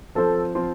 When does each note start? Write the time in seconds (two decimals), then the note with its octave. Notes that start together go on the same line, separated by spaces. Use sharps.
0.15 F3 C4 F4 A4 C5
0.55 F3 C4 F4 C5